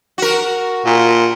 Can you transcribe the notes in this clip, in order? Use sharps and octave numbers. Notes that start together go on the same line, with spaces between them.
F#4 A#4
A#2